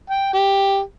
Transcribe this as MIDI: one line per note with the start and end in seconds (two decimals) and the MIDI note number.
0.10 0.34 79
0.34 0.80 67